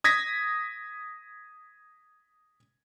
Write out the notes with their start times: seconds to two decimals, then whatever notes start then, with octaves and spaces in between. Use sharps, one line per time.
0.04 D#6 G#6 A#6 B6